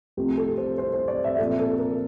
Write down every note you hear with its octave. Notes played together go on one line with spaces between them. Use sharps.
C2 C3 F3 A3 G4
A4
C5
C5
C5
D5
E5
A#2 F3 C4 A4
A4
A#4